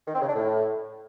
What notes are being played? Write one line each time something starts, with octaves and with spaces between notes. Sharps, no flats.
D#3
C4
C#3
D4
A2